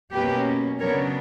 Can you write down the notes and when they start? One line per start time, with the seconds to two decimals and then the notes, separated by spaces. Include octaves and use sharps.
0.12 B2 F#3 A#3 C#4 G4 B4
0.79 C#3 F#3 B3 D4 A#4 C#5